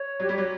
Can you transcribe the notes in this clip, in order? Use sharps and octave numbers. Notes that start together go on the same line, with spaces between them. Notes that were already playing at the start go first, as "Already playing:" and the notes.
Already playing: C#5
F#3 G4
G3
F#3